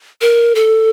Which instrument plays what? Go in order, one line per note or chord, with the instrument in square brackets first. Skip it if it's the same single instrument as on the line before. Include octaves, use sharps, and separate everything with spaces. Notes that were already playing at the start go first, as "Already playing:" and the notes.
[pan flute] A#4
A4